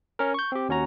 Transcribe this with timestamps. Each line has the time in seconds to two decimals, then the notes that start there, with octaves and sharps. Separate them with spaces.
0.19 C#4 A#4
0.34 C#6 G6
0.52 C4 G4
0.69 D#2 C#4 F#4 A#5